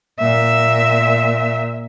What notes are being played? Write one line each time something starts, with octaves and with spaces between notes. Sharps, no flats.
A#2 E5